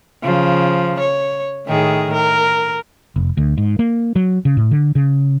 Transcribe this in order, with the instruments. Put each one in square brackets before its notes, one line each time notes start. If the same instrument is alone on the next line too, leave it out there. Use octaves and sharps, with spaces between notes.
[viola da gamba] C#3 F3
C#5
A2 D#3 G#4
A#4
[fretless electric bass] F1
D2
G#2
A#3
F#3
C#3
A2
D3
C#3